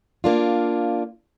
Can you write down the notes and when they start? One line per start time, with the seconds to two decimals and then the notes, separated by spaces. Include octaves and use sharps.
0.24 A#3 D4 F4